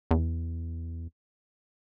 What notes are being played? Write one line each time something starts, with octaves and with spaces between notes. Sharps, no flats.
E2